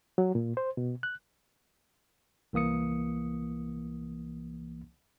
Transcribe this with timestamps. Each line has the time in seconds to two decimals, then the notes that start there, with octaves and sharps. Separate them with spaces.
0.18 F#3
0.35 A#2
0.57 C5
0.77 B2
1.03 F#6
2.53 C2 E3 A#3 D#6 C#7